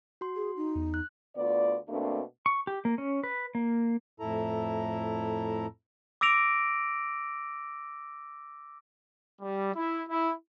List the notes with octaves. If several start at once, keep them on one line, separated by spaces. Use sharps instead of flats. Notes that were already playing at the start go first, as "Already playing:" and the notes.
F#4 C6
G#4
D#4
E2
F#6
D2 B3 F4 D5
B2 A3 A#3 C4 D4
C#6
G4
A#3
C#4
B4
A#3
F2 A2 E4 A4 A#5
D6 E6 A#6 D7 F7
G3
E4
E4